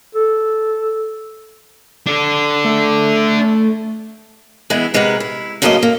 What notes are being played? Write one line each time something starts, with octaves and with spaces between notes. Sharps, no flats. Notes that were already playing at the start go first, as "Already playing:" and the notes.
A4
D4 A4
A3
E3 G#3 B3 E4
C3 G#3 A#4 B4 C#5 F#5
E4
F#2 C#3 A3 A#3 G#4 D#5
A#3